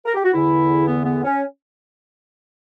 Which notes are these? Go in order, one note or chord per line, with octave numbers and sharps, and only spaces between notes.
A#4
G4
F#4
E2 D3 E4
B3
B3
C#4